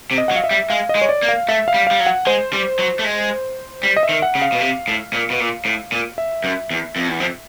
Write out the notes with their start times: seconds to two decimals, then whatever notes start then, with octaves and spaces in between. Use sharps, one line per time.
0.11 C3
0.18 D#5
0.28 F#5
0.31 F#3
0.36 F5
0.44 E5
0.51 G3
0.70 G#3 F5
0.89 D#5
0.95 G#3
1.01 C#5
1.09 D5
1.23 A#3
1.29 F5
1.49 A3 E5
1.68 F5
1.74 G3
1.87 G3 F5
2.00 F#3
2.07 F#5
2.26 G#3 C5
2.53 G3
2.79 F#3
2.99 A3
3.04 G#3
3.83 G3
3.97 D#5
4.03 E5
4.09 D#3
4.22 F#5
4.35 C#3
4.42 F5
4.52 B2
4.61 C3
4.88 A2
5.13 A#2
5.30 B2
5.40 A#2
5.65 A2
5.92 A#2
6.18 E5
6.44 F#2
6.71 E2
6.96 F2
7.08 E2
7.20 F2